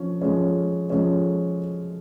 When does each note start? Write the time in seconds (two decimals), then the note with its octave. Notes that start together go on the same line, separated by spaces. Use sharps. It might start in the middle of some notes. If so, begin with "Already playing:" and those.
Already playing: F3 C#4
0.22 F3 G#3 C#4
0.90 F3 G#3 C#4